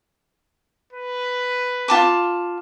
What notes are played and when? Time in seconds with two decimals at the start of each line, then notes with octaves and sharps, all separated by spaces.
0.93 B4
1.88 F4 A5 D6